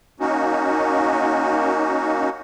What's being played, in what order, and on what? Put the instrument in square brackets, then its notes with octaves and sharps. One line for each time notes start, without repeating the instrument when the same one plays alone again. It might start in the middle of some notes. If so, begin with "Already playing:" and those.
[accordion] A#3 C#4 D#4 F#4